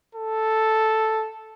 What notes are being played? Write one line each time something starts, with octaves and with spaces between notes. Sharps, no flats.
A4